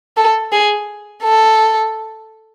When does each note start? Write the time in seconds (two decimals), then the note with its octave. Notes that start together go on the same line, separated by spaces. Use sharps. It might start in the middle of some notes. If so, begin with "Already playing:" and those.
0.17 A4
0.52 G#4
1.23 A4